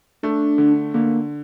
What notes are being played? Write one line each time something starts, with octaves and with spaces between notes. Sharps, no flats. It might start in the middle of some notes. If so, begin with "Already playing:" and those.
A3 D4
D3
D3 A#3